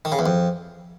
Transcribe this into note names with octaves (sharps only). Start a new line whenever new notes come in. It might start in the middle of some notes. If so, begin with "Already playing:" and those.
D#3
C#3
E2
F2